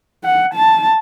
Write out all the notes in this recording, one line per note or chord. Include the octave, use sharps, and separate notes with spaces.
F#5
A5